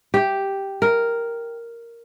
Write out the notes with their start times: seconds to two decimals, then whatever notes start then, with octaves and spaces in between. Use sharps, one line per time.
0.14 G4
0.82 A#4